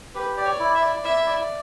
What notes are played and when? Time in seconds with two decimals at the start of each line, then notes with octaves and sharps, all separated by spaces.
0.14 G4 B4
0.37 D5
0.45 C#5
0.59 E4
0.75 E5
0.82 D5
1.04 E4 E5
1.26 D5